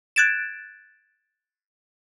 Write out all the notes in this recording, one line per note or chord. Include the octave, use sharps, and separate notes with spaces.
F#6 G#6 A6 D7 E7